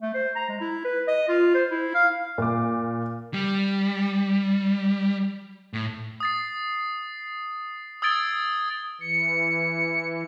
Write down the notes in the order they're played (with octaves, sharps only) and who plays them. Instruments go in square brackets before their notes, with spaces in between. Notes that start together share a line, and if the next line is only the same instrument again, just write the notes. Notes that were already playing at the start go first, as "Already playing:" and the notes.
[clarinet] A3
C5
A#5
G#3
E4
B4
D#5
F4
C5
E4
F5
[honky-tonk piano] A#2 D6
[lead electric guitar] G3
A2
[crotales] D#6 A6 C7
D#6 E6 G#6 A6 D7 G7
[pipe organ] E3 [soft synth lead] C#7